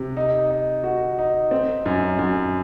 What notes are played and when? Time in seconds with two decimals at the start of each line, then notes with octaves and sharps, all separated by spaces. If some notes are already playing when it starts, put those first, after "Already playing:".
Already playing: C3
0.17 D#4
0.50 D#4
0.84 F#4
1.18 D#4
1.51 C4
1.86 F#2
2.19 F#2